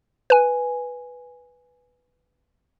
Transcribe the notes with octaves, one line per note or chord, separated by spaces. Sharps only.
B4 G#5